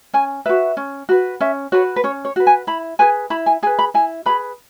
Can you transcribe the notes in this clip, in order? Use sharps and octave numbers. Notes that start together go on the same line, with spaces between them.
C#4 G#5
F#4 B4 E5
C#4
F#4 B4
C#4 E5
F#4 B4 C#5
B4
C#4 C#5
C#5
F#4 B4
G#5
E4 B5
G#4 B4 G#5
E4 B5
G#5
G#4 B4 G#5
B5
E4 G#5
G#4 B4 B5